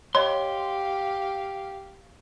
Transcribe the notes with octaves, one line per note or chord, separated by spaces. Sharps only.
G4 C#5 D#5 F5 C6